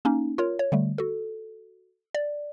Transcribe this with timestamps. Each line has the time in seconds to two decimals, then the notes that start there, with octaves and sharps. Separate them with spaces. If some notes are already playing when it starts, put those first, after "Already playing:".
0.05 A#3 C#4 D#4
0.38 F4 A#4 C#5
0.59 C#5
0.72 D3 G3 A3
0.98 F#4 A4
2.15 D5